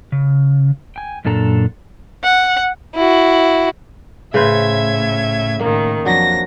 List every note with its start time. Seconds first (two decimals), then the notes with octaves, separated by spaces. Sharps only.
0.12 C#3
0.96 G5 G#5
1.25 F#2 A#2 D4 A4 G#5 A#5
2.24 F#5
2.95 E4 F#4
4.34 A2 C#3 B4 C5 E5 G#6
5.60 A2 D#3 A#3
6.05 F2 F#3 D4 A#6